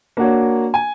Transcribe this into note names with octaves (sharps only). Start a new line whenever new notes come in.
A#3 D4 F#4 C#5
G#5